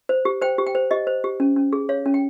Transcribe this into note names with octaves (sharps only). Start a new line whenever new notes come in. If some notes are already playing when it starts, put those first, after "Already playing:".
C5
G4
C5 G5
G4
G5
C5
G4 D#5
C5
G4
C#4
C#4
G#4
C#5 F5
C#4
G5